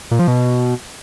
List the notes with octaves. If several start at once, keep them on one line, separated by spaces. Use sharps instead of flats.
A#2
F3
B2